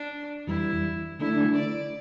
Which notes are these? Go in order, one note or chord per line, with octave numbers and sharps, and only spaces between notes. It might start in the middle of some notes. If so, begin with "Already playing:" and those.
Already playing: D4
F2 E3 G3 E4
D3 A3 D4 E4
D5